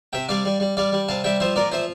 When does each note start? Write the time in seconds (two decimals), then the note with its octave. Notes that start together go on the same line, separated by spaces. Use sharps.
0.13 C3 E5 G5
0.29 G3 D5 F5
0.45 G3
0.60 G3
0.77 G3 D5 F5
0.92 G3
1.08 C3 F5 A5
1.24 G3 E5 G5
1.40 F3 C5 E5
1.56 A#2 A#4 D5
1.72 F3 C5 E5